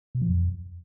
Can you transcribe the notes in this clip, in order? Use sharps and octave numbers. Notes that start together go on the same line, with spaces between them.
B2
F3
F2